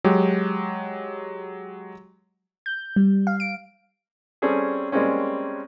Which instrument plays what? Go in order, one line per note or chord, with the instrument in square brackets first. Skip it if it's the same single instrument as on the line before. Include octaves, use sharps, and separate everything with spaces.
[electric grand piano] F#3 G#3 G4
[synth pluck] G6
G3
F5
D7
[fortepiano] G3 C4 C#4 G#4 A4
G3 G#3 A#3 C4 C#4